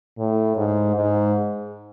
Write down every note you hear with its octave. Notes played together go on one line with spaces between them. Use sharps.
A2
G#2
G#2